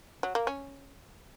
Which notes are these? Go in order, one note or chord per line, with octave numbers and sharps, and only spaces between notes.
F#3
A#3
C#4